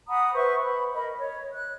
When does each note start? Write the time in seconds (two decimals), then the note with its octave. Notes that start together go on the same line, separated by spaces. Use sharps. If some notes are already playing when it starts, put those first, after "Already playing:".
0.08 F#5 A#5 B5 D#6
0.33 B4 C5 E5 C#6
0.64 B5
0.94 A#4 D#5 B5
1.17 C#5
1.52 F#6